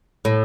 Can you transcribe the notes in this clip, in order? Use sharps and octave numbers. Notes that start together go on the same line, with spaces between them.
A2